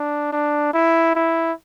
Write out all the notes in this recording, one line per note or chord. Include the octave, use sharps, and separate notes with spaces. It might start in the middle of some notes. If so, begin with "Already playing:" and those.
Already playing: D4
D4
E4
E4